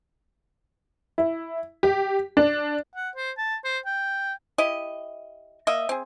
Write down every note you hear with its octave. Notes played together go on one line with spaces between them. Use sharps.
E4
G4
D4
F#5
C5
A5
C5
G5
E4 G4 D#5
A#3 D#5 E5
C4 G#4